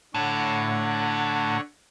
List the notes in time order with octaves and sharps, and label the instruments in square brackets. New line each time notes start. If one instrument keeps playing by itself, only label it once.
[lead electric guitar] A2 [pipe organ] D3 C#5 F#5